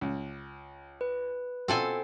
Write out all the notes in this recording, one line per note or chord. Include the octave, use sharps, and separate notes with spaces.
C#2
B4
B2 C4 F4 A4 G#5